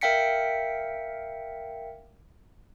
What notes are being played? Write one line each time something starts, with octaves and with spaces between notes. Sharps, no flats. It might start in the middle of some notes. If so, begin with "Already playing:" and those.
A#4 E5 F5 G5 B6 C#7